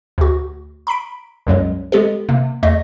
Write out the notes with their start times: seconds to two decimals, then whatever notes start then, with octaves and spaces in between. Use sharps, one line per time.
0.18 D2 F#4
0.87 A#5 B5 B6 D7
1.47 C2 F#2 F#3 G#3
1.92 G#3 B3 G4 A4
2.29 C3 A#3
2.63 E2 A3 D#5 A#6